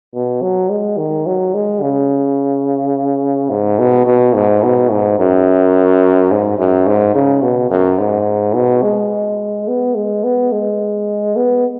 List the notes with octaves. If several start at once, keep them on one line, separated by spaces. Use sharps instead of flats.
B2
F#3
G#3
D#3
F#3
G#3
C#3
G#2
B2
B2
G#2
B2
G#2
F#2
G#2
F#2
G#2
C#3
B2
F#2
G#2
B2
G#3
B3
G#3
B3
G#3
B3